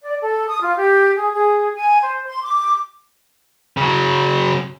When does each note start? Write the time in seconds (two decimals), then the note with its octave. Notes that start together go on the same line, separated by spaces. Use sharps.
0.01 D5
0.21 A4
0.47 D#6
0.61 F4
0.77 G4
1.14 G#4
1.34 G#4
1.75 G#5
2.01 C5
2.27 C6
2.42 D6
3.77 C#3 F#3